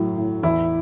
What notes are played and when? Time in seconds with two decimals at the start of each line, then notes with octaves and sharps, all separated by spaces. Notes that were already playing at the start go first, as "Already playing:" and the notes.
Already playing: A2 F#3
0.18 A2
0.43 E2 E4